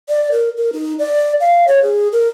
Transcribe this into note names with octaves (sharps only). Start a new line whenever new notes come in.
D5
A#4
A#4
D#4
D5
F5
C#5
G#4
A#4